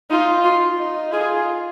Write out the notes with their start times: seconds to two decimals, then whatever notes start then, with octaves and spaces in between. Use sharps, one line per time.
0.10 D#4 F4
0.44 F4
0.78 D#4
1.12 F4 G#4